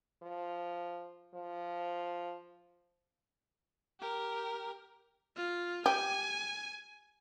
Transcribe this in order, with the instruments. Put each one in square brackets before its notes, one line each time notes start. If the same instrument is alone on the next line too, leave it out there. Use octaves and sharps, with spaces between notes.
[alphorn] F3
F3
[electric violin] G4 A#4
F4
[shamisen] G4 [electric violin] G#5